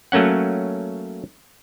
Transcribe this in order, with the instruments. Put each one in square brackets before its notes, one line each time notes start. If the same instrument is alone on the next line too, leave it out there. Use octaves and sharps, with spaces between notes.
[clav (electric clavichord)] F#3 A3 A#3 C#4 F#5